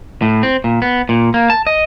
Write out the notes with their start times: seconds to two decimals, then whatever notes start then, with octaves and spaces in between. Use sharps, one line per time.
0.22 A2
0.43 C4
0.64 A#2
0.82 B3
1.09 A#2
1.34 A#3
1.50 A5
1.67 D#5